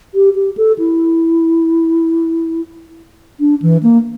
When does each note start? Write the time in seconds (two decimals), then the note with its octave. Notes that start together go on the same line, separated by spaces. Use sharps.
0.15 G4
0.35 G4
0.57 A4
0.79 E4
3.40 D4
3.62 E3
3.83 A#3